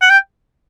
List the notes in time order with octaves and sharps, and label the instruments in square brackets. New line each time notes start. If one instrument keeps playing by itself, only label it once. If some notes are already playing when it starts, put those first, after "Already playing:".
[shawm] F#5
G5